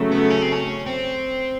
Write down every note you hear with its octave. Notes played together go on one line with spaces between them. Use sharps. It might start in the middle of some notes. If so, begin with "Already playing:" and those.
Already playing: C#3 F#3 A3
B3
C#4
C4
C#4
C4